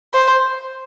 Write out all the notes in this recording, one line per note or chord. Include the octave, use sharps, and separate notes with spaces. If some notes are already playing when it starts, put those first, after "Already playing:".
C5